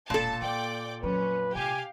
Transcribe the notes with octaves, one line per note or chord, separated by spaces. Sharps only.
E1 A#2 A4 A5
A#3 D5 G5 D6
F2 F#3 C#4 B4
C3 G4 F5 G#5